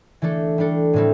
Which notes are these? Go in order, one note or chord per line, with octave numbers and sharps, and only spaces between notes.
E3 A3 D4 A4
G3 D4 A4
A2 E3 G3 C4